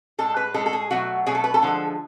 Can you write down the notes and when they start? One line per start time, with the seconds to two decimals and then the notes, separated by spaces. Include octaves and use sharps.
0.18 A2 G#3 A4
0.37 B4
0.54 G#3 A4
0.57 A2
0.66 A4
0.73 G#4
0.91 B2 F#3 A3 F#4
1.26 B2 F#3 A3 G#4
1.35 A4
1.44 B4
1.54 A4
1.62 D3 F3 G#3